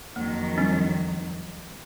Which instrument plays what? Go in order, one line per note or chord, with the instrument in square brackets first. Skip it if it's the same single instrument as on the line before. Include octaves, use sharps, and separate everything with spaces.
[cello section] F2 D#3 F#3 [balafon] A#3
[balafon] G3 C4 D4